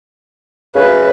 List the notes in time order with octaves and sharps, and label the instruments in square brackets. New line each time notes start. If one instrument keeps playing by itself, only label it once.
[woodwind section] F#2 C#3 [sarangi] B4